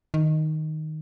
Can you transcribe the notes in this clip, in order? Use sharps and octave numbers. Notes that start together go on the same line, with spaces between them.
D#3